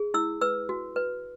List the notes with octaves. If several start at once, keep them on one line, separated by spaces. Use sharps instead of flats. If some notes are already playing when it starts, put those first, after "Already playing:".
Already playing: G#4
E4 E6
B4 E6
F#4
B4